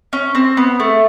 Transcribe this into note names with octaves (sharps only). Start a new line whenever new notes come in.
C#4
C4
B3
A3